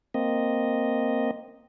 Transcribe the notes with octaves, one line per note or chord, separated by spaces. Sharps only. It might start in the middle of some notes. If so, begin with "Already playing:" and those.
A#3 C4 D#5